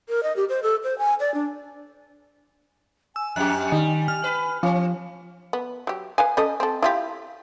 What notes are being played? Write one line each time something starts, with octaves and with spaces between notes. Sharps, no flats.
A#4
D#5
G4
C5
A4
C5
G#5
D5
D4
G#5 E6
F2 G4 F#6
D#3 G3
F6
B4
F3 C4
B3
F#3 G4
B4 F5 G#5
C#4 A4 D#5
C4 A4
E4 F4 G4